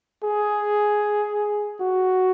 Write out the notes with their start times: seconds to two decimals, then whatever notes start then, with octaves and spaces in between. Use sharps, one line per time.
0.24 G#4
1.80 F#4